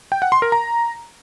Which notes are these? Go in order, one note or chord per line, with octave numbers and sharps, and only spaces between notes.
G5
F#5
C6
A#4
A#5